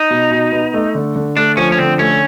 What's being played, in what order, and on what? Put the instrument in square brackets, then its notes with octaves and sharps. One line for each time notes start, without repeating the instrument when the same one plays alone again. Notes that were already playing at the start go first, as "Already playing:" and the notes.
Already playing: [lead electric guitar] D#4
[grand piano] B2
B2
B3
A3
D3
D3
[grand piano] A3 [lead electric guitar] D4
[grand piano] F3 [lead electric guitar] C#4
[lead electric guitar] C#4
[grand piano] D3 [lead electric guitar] C4
[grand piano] A3 [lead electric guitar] C#4